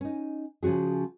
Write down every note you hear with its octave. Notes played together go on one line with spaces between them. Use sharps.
C#4 D#4
C#3 F3 C#4 F#4 G#4